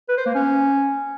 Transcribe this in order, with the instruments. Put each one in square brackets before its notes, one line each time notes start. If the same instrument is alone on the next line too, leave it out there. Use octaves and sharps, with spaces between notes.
[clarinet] B4
C5
A#3
C#4